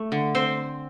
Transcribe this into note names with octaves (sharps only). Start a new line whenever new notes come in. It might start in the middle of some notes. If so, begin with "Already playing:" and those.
Already playing: A3
D3
C4 C5